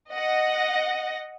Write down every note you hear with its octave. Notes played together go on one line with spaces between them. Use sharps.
D#5 F#5 A#6